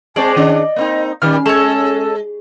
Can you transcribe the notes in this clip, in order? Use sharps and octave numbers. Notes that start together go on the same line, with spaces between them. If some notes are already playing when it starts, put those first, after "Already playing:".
G#3 C4 C5 D5 A5
D#3 C#4 D4 D#5
A#3 C4 D#4
A#2 D#3 G3 C#4 F6
G#3 A4 C#5